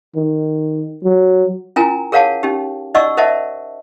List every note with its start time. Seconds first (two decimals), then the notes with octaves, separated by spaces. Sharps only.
0.16 D#3
1.04 F#3
1.76 C#4 E4 F4 A#4 G#5 A#5
2.12 G#4 A#4 C#5 F5 F#5 A5
2.43 C#4 D#4 G4
2.94 D#4 D5 D#5 F#5 C#6 E6
3.17 A#4 C5 D#5 E5 F#5 A5